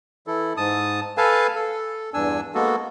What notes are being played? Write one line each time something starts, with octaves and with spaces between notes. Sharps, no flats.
E3 E4 A4
G#2 A5 D#6
A4 B4 F5 G#5 A5
A4
E2 G2 D4 G#5 E6
G#3 A#3 B3 F#4 A4